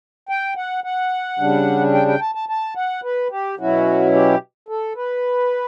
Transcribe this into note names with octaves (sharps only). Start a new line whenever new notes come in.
G5
F#5
F#5
C#3 G3 D4
G5
G5
A5
A5
A5
F#5
B4
G4
B2 F#3 C#4 E4 F#4
G4
A4
B4